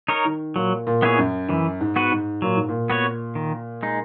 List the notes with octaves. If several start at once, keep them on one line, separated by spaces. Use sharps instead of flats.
D#4 A#4 C#5
D#3
A#2 F#3
A#2
B3 E4 G#4 C#5
F#2
F#2 E3
G#2
B3 F#4 B4
G#2
A#2 F#3
G#2
A#2
B3 F#4 C#5
D#3
G#3 D#4